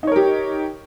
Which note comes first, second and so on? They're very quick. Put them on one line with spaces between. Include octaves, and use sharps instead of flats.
D#4 C#5 A#4 G4